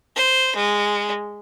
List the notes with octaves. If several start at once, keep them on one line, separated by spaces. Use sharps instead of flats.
C5
G#3